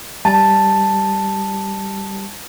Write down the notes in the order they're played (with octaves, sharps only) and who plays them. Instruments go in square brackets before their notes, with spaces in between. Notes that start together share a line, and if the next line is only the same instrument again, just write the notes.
[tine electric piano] G3 [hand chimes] A5